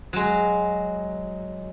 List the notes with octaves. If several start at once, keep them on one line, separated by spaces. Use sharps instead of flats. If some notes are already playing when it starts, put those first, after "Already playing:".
F#3 G#3